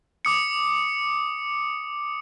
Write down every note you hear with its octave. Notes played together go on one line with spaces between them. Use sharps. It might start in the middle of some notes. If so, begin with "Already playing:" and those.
D6 D#6 C#7